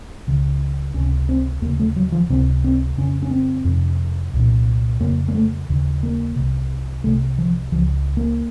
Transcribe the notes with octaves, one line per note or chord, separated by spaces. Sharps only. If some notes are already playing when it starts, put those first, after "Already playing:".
C#2 C#3
C#2 C3 C#4
C4
D#2 C#3 A#3
A3
F#3
F3
C#2 C3 C4
C4
F2 C#3 C#4
C#4
C4
F2 C3
C2 A#2
F2 C#3 A#3
A#3
A3
D#2 C#3
A#3
C2 C3
C2 C3 A3
F3
C#2 C#3 F3
A#3